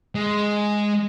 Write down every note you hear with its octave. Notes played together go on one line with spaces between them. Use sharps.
G#3